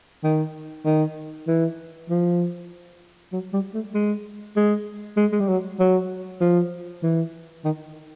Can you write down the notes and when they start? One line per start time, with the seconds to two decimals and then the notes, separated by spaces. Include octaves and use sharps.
0.24 D#3
0.85 D#3
1.47 E3
2.09 F3
3.33 F#3
3.53 G3
3.74 A3
3.94 G#3
4.56 G#3
5.17 G#3
5.32 G#3
5.40 G3
5.48 F#3
5.80 F#3
6.41 F3
7.03 E3
7.65 D#3